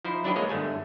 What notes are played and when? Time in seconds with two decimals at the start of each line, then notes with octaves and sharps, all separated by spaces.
0.05 F3 D#4 E4 C5
0.24 F#3 D4 E4 G4 B4 D#5
0.36 G#3 A#3 G#4 C#5 D#5
0.49 G1 D3 A3 G#5